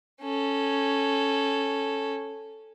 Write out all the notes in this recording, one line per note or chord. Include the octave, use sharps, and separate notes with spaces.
C#4 A4